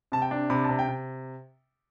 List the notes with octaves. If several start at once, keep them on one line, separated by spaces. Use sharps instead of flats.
C3 A5
G5
D4
C3 B5
C3 A5
G5
C3